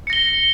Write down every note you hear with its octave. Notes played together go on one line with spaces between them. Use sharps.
A#6 C#7 G7